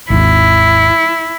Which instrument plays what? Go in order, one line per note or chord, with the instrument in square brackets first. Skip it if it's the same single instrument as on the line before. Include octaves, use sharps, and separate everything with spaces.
[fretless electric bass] G#1 D#2 [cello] E4